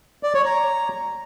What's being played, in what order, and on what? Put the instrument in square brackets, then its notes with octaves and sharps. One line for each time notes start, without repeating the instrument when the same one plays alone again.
[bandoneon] D5
C#5
A#5